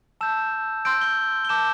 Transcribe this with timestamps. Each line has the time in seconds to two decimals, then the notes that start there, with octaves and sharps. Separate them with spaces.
0.21 A5 E6 G6 E7
0.85 C6 E6 G6 D7
1.01 G7
1.45 G7
1.49 A5 D6 G6 E7